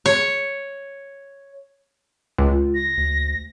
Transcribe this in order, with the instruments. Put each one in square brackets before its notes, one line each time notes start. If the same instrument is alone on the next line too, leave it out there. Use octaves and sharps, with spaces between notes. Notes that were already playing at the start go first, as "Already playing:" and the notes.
[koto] C#5
[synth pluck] C#2 [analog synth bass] F4
[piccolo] A#6
[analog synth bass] D2